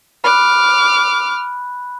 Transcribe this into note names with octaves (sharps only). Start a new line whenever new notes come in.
B5 D6 F6 F#6